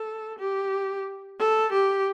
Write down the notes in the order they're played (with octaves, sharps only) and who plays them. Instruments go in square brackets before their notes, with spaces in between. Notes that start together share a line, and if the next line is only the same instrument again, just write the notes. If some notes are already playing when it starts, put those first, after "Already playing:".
Already playing: [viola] A4
G4
A4
G4